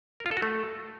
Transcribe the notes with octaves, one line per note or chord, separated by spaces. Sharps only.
A#4
F4
A4
F#4
A3